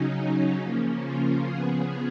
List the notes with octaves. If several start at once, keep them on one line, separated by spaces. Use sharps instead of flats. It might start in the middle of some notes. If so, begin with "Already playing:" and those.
Already playing: C#3 F#3 C#4 D#4
C#3 F3 A#3 C#4
F4
C#3 F3 B3 G#4